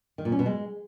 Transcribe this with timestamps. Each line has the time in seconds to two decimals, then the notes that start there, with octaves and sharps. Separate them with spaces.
0.18 D#3
0.25 A#2
0.32 C#4
0.39 B2
0.46 G#3